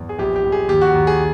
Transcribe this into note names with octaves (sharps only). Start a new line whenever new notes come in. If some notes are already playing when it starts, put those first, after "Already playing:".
Already playing: E2
G#4
A#1 G4
G4
A#1
G#4
D#2 G4
F#4
D#2
G#4